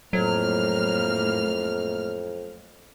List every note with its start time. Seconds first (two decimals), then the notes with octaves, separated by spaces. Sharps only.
0.13 F2 A2 F#3 A#3 F6